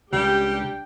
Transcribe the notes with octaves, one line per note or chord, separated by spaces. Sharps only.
C#2 G3 D4 G4 G5